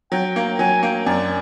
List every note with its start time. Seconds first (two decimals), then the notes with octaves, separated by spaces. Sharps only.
0.12 F#3 G5
0.36 A#3
0.59 F#3 G#5
0.83 A#3 G5
1.06 F#2 D5